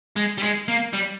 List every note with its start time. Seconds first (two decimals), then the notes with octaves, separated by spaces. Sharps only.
0.16 G#3
0.38 G3
0.43 G#3
0.68 A#3
0.93 G3